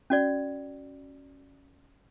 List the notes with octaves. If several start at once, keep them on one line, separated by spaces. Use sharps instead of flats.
C#4 F#4 D5